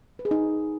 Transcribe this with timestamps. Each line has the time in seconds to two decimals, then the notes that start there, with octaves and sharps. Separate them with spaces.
0.19 B4
0.25 G#4
0.31 D#4